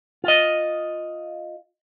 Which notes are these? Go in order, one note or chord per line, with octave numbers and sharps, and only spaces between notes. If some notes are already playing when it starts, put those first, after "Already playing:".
F4 D#5